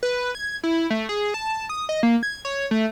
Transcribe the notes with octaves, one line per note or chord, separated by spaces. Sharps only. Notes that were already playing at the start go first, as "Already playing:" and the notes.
B4
G#6
E4
A3
G#4
A5
D#6
D#5
A#3
G#6
C#5
A3